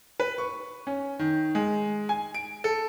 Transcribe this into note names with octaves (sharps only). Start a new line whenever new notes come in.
B4
C#6
C#4
D#3
G#3
G#5
D7
A4